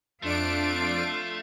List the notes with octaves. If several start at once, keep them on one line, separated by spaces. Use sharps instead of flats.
F2 A3 D4 F4 D7